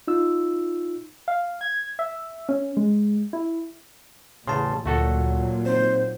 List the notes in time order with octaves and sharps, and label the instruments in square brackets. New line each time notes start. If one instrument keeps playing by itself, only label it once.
[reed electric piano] D#4 F4 E6
[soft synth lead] F5
G#6
E5
C#4
G#3
E4
[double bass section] A1 [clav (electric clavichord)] E2 C#3 [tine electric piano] A5 C6
[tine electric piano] D2 [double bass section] A#2 F#3 [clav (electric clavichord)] A3 F#4 A4
[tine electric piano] C4 D#4 [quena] C5